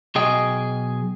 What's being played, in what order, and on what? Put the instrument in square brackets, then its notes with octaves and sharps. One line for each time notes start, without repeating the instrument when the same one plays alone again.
[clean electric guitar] B1 F#3 G#4 D#5 G5